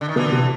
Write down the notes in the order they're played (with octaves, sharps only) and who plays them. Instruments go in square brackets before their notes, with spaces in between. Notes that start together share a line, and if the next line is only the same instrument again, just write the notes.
[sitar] D3
D#3
[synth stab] B2 [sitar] D3 E3
[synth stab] C3